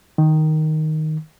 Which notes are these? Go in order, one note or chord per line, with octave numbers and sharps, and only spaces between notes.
D#3